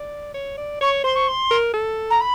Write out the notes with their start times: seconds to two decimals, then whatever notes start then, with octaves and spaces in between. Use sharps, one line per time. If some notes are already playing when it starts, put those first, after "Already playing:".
Already playing: D5
0.34 C#5
0.58 D5
0.81 C#5 C#6
1.04 C5 C6
1.15 C#6
1.27 C6
1.51 A#4
1.73 A4
2.10 A#5
2.20 B5